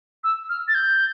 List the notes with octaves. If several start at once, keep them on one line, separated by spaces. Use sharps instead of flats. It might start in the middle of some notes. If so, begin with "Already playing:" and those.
E6
F6
A6
G6